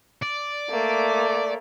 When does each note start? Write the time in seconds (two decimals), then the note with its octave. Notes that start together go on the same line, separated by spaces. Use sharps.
0.22 D5
0.69 A3 A#3